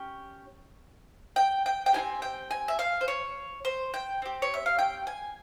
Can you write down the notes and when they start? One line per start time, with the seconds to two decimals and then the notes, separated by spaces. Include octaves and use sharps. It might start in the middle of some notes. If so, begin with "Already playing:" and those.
Already playing: C#4 G4
1.36 G5
1.66 G5
1.86 G5
1.93 E4 G4 G#5
1.98 C4
2.22 G5
2.51 G#5
2.68 E5
2.79 F5
3.01 C5
3.08 C#5
3.65 C5
3.94 G5
4.22 C4 G4
4.42 C#5
4.54 E5
4.66 F5
4.79 G5
5.07 G#5